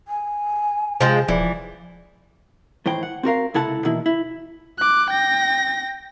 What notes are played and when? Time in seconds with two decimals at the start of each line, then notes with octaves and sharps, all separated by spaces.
0.08 G#5
1.01 C3 F3 G#3 G5
1.28 D#1 E3 F3 E4 D5
2.86 A2 D#3 E3 C5 G5
3.03 F#5
3.23 C4 F#4 A#4 F5
3.54 C#2 C3 E4 A4 F#5 A5
3.85 B2 D#3 E3 A#3 E4
4.06 E4
4.78 D6 F#6
5.11 G5 A#6